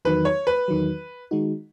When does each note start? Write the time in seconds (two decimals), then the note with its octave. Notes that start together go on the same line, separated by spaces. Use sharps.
0.05 E2 D#3 F#3 B4
0.25 C#5
0.47 B4
0.68 E2 D#3 F#3
1.31 D#3 G#3 D#4 F#4